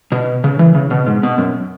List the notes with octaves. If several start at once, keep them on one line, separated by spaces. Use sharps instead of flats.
B2
C#3
E3
C#3
B2
G#2
B2
F#2